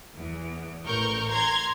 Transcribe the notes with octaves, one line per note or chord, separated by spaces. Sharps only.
E2
A1 A#4 C#6 G6
A#5 C6 G#6